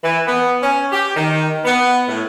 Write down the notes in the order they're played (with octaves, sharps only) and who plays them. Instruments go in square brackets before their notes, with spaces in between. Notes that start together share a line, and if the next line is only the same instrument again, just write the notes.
[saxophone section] E3
B3
C#4
G4
D#3
B3
A2